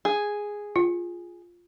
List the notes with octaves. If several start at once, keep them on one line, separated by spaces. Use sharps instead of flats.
G#4
F4